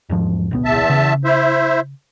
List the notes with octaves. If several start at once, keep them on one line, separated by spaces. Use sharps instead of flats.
E2 G#2 F3
D1 B1 B3
E2 E5 A5
C#3
E4 C5 E5